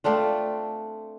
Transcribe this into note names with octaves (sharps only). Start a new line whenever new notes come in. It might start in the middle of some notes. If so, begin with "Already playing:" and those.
A3 C4 D4 F4